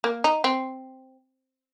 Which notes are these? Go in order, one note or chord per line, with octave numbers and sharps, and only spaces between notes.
A#3
D#4
C4